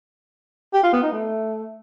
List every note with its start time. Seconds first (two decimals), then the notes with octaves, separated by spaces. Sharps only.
0.74 G4
0.83 F4
0.93 B3
1.03 D#4
1.12 A3